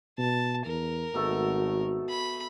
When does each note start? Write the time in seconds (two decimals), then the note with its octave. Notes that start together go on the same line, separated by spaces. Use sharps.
0.18 B2 A5
0.66 E2 A#4
1.14 G#1 B2 A3 A4
2.09 B5